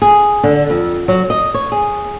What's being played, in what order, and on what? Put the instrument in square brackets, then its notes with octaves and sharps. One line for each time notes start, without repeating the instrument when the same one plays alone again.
[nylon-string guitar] G#4
D3
F2
F#3
D#5
C#5
G#4